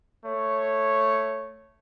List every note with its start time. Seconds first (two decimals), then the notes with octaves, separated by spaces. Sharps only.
0.25 A3 C#5